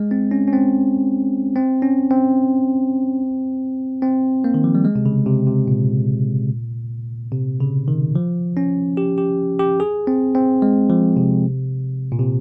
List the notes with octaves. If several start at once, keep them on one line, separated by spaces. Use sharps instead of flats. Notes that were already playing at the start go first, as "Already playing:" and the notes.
Already playing: G#3
C4
C#4
C#4
C4
C4
C#4
C4
C4
A#3
D#3
F3
G3
G#3
C3
C#3
C3
C3
A#2
C3
C#3
D#3
F3
C#4
G4
G4
G4
G#4
C4
C4
G#3
F3
C3
A#2
C3